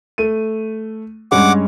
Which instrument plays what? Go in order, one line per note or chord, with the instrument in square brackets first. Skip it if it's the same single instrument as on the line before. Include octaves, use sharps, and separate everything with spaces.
[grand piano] A3 D#7
[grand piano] G2 G#3 C#4 [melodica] F#5 D6